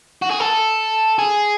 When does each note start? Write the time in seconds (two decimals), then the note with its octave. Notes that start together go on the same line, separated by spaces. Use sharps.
0.22 F#4
0.30 G#4
0.40 A4
1.19 G#4